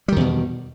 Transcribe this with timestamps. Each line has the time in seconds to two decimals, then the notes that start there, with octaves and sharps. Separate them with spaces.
0.08 G3
0.12 D#3
0.16 E2
0.20 B2